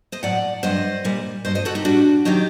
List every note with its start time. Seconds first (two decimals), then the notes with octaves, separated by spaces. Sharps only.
0.12 C5 D#5
0.23 A2 F#3 D5 F#5
0.63 G2 F#3 C5 D#5
1.05 A#2 G3
1.45 G2 F#3 C5 D#5
1.55 C5 D#5
1.65 F#4 A4
1.75 D#4 G4
1.85 A2 G3 D4 F#4
2.25 D#3 F#3 D#4 G4